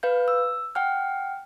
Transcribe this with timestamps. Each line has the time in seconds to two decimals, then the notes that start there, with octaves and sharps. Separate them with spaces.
0.03 B4 F5 G6
0.28 E6
0.75 F#5 G5 F6